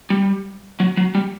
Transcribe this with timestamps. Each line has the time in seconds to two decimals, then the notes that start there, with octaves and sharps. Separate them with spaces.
0.10 G3
0.80 F#3
0.97 F#3
1.15 G3